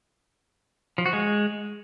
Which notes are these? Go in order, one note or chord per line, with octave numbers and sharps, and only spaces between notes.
F3
F#4
G#3